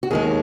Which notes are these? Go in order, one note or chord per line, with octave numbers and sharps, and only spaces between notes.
F#4
D#2 D#3 G#3 G#4